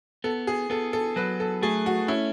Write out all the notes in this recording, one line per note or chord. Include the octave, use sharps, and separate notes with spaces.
B3 A4
G#4
B3 A4
A4
F#3 B4
A4
A3 G#4
F#4
C#4 E4